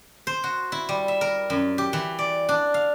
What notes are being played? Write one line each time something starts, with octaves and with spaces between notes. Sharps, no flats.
C5
F#4
E4
G3
E5
A#4
F#2
G4
E3
D5
D4
F5